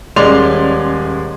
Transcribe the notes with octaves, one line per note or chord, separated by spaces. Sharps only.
D#1 G#3 C#4 D5 C6 F7